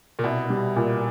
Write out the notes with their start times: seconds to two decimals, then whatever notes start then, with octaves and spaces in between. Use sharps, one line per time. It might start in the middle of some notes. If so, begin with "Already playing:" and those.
0.19 A#2
0.24 C2 B2
0.50 G3
0.76 A#2